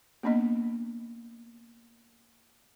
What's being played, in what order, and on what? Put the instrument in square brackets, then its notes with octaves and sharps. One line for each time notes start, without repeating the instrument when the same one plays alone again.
[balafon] A#3 B3 C#4 D4 D#5